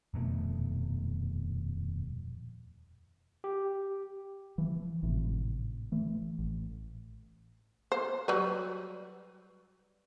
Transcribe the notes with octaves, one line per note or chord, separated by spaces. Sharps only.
D#1 F2 B2 A3
G4
E3 F3
G#1 A2 C3
E3 A3
A1
C5
F#3 G3 B4